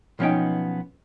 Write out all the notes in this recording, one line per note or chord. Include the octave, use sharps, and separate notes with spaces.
B1 F3 B3 C#4 D#4 G5